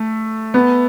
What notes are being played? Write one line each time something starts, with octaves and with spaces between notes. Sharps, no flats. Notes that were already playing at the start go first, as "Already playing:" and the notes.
Already playing: A3
B3